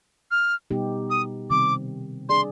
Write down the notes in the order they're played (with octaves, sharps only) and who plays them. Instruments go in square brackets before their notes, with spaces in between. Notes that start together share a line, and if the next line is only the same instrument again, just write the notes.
[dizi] F6
[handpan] B2 G3 B3 D#4 G4
[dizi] D#6
[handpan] C3 D#3 G3 C4 [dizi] D6
[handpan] G3 D4 G#4 D5 [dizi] C6